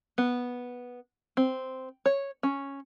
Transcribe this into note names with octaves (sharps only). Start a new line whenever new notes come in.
B3
C4
C#5
C#4